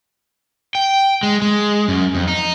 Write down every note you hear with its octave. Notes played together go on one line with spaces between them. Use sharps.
G5
G#3
G#3
F#2
F2
D#4